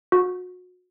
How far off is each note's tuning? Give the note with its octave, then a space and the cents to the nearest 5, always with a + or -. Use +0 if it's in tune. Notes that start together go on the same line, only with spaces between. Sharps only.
F#4 -30